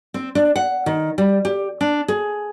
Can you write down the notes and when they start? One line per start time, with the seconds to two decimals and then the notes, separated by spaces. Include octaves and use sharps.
0.14 C4
0.35 D4
0.56 F#5
0.86 D#3
1.18 G3
1.45 G4
1.81 D4
2.08 G#4